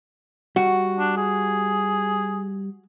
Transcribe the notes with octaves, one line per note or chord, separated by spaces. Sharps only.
G3 F#4 F#5
D4
G#4